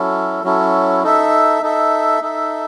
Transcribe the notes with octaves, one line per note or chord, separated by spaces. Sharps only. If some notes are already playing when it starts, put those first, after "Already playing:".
Already playing: F#3 C#4 E4 A4
F#3 C#4 E4 A4
D#4 A4 E5
D#4 A4 E5
D#4 A4 E5